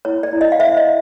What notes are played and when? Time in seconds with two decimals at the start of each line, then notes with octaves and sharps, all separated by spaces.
0.05 E4 C#5
0.23 D5
0.33 E4
0.41 D#5
0.52 F5
0.60 C5 E5
0.77 D#5
0.86 E4